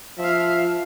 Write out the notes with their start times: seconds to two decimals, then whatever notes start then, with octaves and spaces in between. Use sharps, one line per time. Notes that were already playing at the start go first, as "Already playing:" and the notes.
0.18 F3 E5 F5